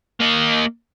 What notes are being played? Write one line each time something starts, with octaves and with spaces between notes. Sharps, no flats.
A#3 D#5